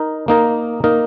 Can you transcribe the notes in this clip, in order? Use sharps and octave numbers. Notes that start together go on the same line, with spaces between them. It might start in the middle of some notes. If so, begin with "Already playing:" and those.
Already playing: D#4 A#4
A#3 D#4 A#4
A#3 D#4 A#4